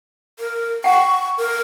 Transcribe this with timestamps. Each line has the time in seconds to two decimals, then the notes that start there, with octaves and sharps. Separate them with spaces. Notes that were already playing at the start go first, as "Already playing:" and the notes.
0.39 A#4
0.84 F#5 G5 C#6
1.38 A#4